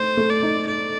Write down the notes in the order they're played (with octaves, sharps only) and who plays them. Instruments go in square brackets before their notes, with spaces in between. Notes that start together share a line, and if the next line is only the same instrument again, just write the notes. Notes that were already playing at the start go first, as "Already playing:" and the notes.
Already playing: [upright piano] A3 D#4 A4 [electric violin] C5
[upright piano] A3
[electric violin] D5
[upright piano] D#4
[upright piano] A4 [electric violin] D5